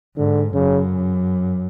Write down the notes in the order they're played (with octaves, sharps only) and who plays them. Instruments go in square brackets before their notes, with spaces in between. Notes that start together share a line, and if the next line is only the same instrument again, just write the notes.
[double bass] G#2 [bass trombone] D3
[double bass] F#2 [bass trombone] C#3